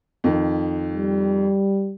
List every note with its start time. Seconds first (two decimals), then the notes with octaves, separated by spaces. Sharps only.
0.24 F2 D#3
0.93 G3